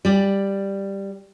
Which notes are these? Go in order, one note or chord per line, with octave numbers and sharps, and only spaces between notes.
G3 D5